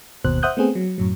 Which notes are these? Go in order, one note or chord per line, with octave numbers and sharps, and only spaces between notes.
G1 D#2 B2 C5 F#6
C5 E5 F#5 D#6 F#6 G6
A3 B3 C4 G#4
F#3
F#2 A2 F#3